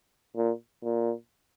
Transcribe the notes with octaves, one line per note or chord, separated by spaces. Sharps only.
A#2
A#2